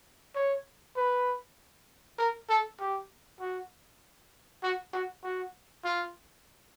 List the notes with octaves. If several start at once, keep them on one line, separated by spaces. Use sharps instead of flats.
C#5
B4
A#4
A4
G4
F#4
F#4
F#4
F#4
F4